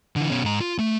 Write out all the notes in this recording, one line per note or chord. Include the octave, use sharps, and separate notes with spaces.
D3 E3
B2 C#4
G#2 A#5
F4
A3